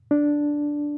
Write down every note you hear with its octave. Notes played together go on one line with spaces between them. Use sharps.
D4